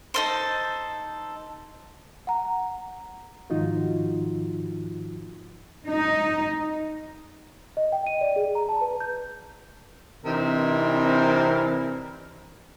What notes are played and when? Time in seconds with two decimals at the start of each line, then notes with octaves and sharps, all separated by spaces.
0.14 D#4 A4 C5
2.27 F#5 A#5
3.50 G#2 D#3 F3 D#4 F4 F#4
5.87 D#4
7.77 D#5
7.92 G5
8.07 D#7
8.21 D5
8.36 G#4
8.55 A#5
8.69 A5
8.81 B4
9.00 G6
10.25 C3 E3 C4 D4 D#4 A#4